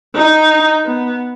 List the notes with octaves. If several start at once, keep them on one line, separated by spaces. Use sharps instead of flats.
D#4
B3